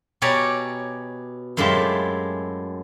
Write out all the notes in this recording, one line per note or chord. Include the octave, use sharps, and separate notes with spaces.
B2 G4 C#5 D5 G#5 A#5
F#2 A2 G#3 F4 G4 E5